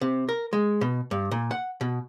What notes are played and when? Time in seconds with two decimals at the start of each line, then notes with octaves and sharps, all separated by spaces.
0.01 C3
0.29 A#4
0.53 G#3
0.81 B2
1.11 G2
1.31 A#2
1.51 F#5
1.81 B2